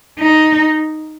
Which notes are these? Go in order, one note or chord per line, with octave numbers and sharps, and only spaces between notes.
D#4